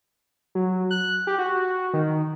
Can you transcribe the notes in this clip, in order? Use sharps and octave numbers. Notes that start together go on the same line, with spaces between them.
F#3
F#6
G4
F#4
D#3